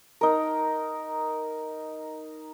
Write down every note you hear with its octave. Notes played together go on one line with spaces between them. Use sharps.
D#4 A#4